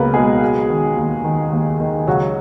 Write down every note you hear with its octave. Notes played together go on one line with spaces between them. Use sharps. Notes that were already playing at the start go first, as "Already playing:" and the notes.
Already playing: C#2 F#3 A#3 B3 A#4 B4
B2 G#3 G#4
F#3
D#3
D#2
D#3
D#2
D#3
C#2 F#3 F#4